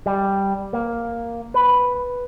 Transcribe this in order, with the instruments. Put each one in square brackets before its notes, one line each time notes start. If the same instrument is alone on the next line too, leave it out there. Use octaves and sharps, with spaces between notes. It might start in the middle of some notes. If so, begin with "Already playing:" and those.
[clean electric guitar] G3
A#3
B4